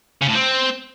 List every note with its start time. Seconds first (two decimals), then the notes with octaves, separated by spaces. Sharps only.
0.22 C#3
0.29 A2
0.35 C4